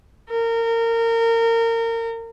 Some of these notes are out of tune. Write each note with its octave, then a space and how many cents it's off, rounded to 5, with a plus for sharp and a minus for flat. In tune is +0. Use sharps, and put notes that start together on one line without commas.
A#4 -25